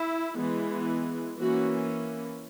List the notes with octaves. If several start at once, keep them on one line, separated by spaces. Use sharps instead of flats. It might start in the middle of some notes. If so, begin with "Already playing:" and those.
Already playing: E4
E3 G#3 B3
E3 A#3 C#4 F#4